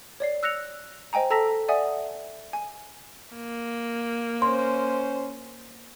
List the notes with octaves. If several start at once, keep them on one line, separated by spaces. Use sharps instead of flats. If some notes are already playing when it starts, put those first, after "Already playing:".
C#5 D5 C7
E6 F#6 A#6 C#7 F7
C5 D#5 G5 G#5 A#5
A4 A5 A#5 E6 A#6 B6
D5 E5 F#5 G#5 D#6
G#5
A#3
C#4 C5 C6